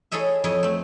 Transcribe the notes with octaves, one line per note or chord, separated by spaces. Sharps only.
E4 G#4 A4 C#5 D#5 E5
F2 E4 C#5 D#5
A3 C4